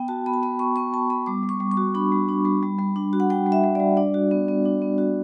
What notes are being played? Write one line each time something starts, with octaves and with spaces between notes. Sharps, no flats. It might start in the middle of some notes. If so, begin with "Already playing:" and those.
Already playing: B3 G5
F#4 A5
B3 B5
A5
B3 B5
B3 C#6
B3 C#6
B3 A5
B3 B5
G3 D6
G3
C#6
G3
C#6
F#4
D4 B5
G3
D4
G3
G3
G3
D4
F#4
F#5
G3 G5
G3
E5
G3
G3 D5
D4 D5
F#4
B3
B3
D4
B3
F#4